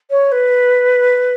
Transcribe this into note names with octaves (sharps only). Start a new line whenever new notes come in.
C#5
B4